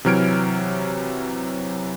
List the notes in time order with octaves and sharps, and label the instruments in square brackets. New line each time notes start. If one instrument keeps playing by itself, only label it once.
[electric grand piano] C3 E3 F#3 F6 G#6 D7